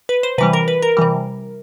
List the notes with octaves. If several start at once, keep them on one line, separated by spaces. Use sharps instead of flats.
B4
C5
C3 E3 G3 B4
A#4
B4
A#4
C3 E3 G3